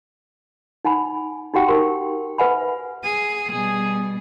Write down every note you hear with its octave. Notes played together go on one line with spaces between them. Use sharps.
D#4 F#5 G#5 B5
D#4 F#4 G4 F#5 G5
D#4 G4 A#4 C6
B4 E5 F#5 G#5 B5
G#4 D#7
B2 G3 G#4